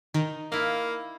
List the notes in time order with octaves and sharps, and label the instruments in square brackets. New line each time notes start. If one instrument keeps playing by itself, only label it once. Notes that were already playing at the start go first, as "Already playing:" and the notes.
[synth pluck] D#3 [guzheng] D#4
[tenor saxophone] A#3 [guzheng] E4 F5